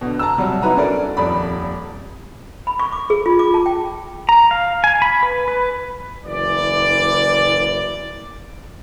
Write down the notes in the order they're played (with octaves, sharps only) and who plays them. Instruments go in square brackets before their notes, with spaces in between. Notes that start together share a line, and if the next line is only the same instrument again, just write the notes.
[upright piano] B2 D3
A5 A#5 E6
C3 F#3 G3
D#4 E4 F#4 B4 A#5
C#4 D4 F#4 A4 A#4 D5
D#1 F2 D5 B5
[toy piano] B5
C#6
D6
G#4
F4
D6
A5
G5
[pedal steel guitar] A#5
F5
G#5
B5
B4
B4
[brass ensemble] F#1 E3 D5